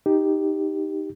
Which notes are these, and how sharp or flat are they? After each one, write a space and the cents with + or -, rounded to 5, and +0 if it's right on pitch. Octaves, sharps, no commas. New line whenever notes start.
D#4 +0 G4 +0